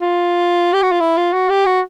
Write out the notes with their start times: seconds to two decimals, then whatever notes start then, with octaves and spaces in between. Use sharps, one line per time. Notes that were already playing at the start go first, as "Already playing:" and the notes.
0.01 F4
0.74 G4
0.83 F#4
0.92 F4
1.01 E4
1.17 F4
1.33 F#4
1.50 G4
1.66 F#4